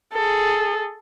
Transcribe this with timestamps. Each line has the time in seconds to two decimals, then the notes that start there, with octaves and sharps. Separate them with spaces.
0.13 G#4 A4